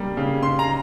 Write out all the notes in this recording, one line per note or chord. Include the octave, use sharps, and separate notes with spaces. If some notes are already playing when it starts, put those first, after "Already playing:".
Already playing: C#3 G3 A#3
C#3
C#3 C6
A#5